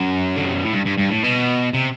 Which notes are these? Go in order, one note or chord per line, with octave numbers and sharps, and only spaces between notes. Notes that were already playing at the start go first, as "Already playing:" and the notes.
Already playing: F#2
D3
C3
B2
A2
G2
G2
G2
A2
B2
C3